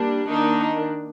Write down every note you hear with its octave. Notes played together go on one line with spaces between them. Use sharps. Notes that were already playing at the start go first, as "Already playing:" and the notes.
Already playing: G3 A#3 D4
D#3 A#3 D4 D#4